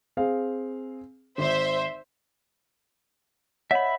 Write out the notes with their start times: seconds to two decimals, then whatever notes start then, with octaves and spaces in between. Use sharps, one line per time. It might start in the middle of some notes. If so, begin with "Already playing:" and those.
0.17 C4 G#4 F5
1.38 G#1 C5 E5
3.71 C#5 D#5 E5 F#5 B5